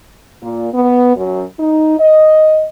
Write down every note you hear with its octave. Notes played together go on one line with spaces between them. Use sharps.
A#2
B3
F#2
D#4
D#5